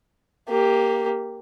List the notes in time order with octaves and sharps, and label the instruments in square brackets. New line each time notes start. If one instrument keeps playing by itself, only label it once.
[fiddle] A#3 G4